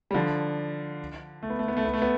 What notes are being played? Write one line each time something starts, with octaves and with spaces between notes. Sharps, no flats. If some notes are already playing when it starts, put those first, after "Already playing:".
G3
D3 F3
A3
B3
A3
B3
A3
B3
A3
B3